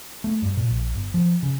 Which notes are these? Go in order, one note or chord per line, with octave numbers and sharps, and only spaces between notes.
A3
G2
A#2
A#1
G1
F3
C#3